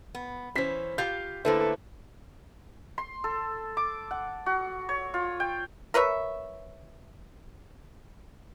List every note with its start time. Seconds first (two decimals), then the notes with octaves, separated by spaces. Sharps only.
0.15 B3
0.55 E3 C#4 C5 B6
0.98 F4 G4 F5 G6
1.45 D3 A3 A#3 E4 A4 B4 C5
2.98 C6
3.24 A4
3.77 D6
4.11 F#5
4.46 F#4
4.89 C#5
5.14 F4
5.40 G5
5.94 A#4 B4 C#5 E5